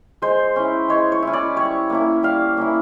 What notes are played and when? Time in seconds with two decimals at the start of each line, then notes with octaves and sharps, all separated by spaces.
0.22 G#3 C5
0.56 C#4 E4
0.89 G#3 C#5
1.12 C#5
1.23 C#4 E4
1.33 D5
1.56 G3 C#5
1.90 A#3 C#4 E4
2.23 G3 F5
2.57 A#3 C#4 E4